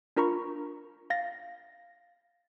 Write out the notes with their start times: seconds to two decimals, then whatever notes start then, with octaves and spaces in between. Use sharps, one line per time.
0.17 D4 F4 A#4 A#5 B5 C#6
1.10 F5 A6 A#6